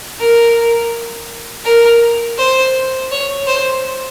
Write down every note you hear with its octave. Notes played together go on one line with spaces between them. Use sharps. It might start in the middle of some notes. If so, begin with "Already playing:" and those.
A#4
A#4
C5
C#5
C5